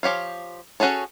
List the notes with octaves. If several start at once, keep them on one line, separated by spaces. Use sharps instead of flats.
F3 G4 C#5 F5
C#4 F#4 G#4 A4 C#5